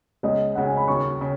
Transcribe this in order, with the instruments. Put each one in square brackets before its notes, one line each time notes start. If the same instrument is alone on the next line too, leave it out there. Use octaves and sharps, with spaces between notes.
[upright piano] C#2 C#3 G#3 [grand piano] D#5
[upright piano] C#2 C#3 G#3 [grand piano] F#5
[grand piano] G#5
B5
[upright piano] D#2 C#3 F#3 [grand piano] C#6
[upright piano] C#3